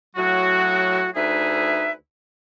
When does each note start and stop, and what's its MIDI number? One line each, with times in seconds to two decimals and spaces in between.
0.15 1.09 45
0.15 1.09 54
0.15 1.09 66
1.16 1.92 38
1.16 1.92 63
1.16 1.92 68
1.16 1.92 71
1.16 1.92 76